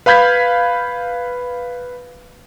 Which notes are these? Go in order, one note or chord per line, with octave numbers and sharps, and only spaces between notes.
B4 F5 B5 G6 G#6 B6